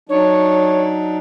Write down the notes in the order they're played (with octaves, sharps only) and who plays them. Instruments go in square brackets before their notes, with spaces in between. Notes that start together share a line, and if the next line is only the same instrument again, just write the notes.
[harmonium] F#3 D4 D#4 [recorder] C#5